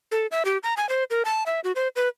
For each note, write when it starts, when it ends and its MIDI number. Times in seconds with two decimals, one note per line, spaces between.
0.12 0.27 69
0.31 0.43 76
0.45 0.58 67
0.63 0.74 82
0.77 0.88 80
0.89 1.04 72
1.10 1.23 70
1.25 1.43 81
1.46 1.60 76
1.64 1.72 66
1.75 1.88 72
1.96 2.08 71